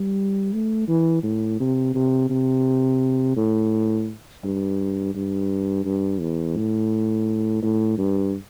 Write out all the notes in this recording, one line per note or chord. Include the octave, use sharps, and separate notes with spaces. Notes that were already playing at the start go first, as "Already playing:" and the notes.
Already playing: G3
A3
E3
A2
C3
C3
C3
A2
G2
G2
G2
E2
A2
A2
G2